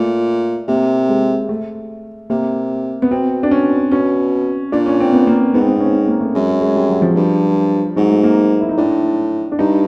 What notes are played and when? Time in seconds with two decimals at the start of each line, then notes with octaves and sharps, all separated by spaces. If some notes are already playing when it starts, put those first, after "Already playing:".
Already playing: A#2 A3
0.68 C3 A#3
1.09 G#3
1.49 A3
2.30 C3 A#3
3.02 B3
3.11 B2 C4
3.43 D4
3.51 C#4
3.92 B2 C#4
4.72 A#2 D4
4.86 C#4
5.00 C4
5.13 B3
5.27 A#3
5.54 G#2 B3
5.61 C4
5.67 B3
5.77 C4
5.80 C#4
5.94 C#4
6.08 A#3
6.21 A3
6.35 F#2 G#3
6.49 G#3
6.61 G#3
6.75 G3
6.89 F#3
7.02 F3
7.16 G2
7.96 G#2 F#3
8.10 A3
8.24 A#3
8.61 E4
8.69 D#4
8.77 A2 D4
9.52 D4
9.58 G2 D#4